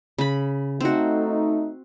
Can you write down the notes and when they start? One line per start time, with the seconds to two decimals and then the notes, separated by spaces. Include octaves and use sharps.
0.18 C#3 B5
0.80 A3 C4 D#4 F#4